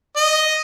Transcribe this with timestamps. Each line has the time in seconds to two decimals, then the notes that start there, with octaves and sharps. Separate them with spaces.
0.16 D#5